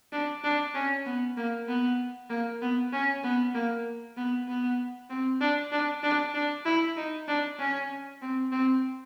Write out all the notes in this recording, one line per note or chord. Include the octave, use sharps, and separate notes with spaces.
D4
D4
C#4
B3
A#3
B3
A#3
B3
C#4
B3
A#3
B3
B3
C4
D4
D4
D4
D4
E4
D#4
D4
C#4
C4
C4